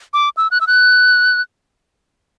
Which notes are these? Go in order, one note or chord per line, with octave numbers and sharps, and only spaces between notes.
D6
E6
F#6
E6
F#6